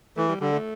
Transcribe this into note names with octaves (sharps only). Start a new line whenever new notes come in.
E3 A3
G3
D3 G3
A3